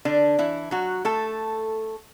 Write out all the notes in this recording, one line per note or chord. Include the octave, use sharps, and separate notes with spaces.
D3 D4
E3 E4
F#3 F#4
A3 A4